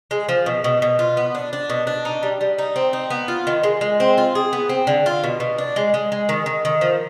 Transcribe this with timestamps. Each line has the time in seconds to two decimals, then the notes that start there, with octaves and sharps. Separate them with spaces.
0.11 G#3
0.29 F3
0.46 B2
0.64 B2
0.82 B2
0.99 F4
1.17 B3
1.35 D4
1.53 D4
1.70 B2
1.87 D4
2.05 D#4
2.23 G3
2.41 G3
2.58 D#4
2.76 C4
2.93 D#4
3.10 B3
3.28 F4
3.47 D#3
3.64 G#3
3.81 G#3
4.00 C4
4.18 F4
4.35 G#4
4.53 B3
4.69 C4
4.87 D3
5.06 F4
5.24 B2
5.40 B2
5.58 D4
5.76 G#3
5.94 G#3
6.12 G#3
6.29 D#3
6.46 D#3
6.65 D#3
6.81 F3